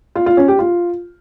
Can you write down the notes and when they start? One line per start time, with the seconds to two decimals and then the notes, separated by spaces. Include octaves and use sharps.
0.15 F4
0.26 F4
0.37 C#4
0.48 G4
0.59 F4